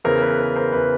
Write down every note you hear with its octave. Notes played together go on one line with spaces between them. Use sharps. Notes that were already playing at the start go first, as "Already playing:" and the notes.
E2 C#3 E3 A#4 C5
B4
B4
A#4 C5
E2 C#3 E3 B4